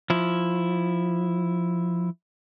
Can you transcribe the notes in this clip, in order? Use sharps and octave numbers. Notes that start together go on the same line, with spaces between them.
F3 E4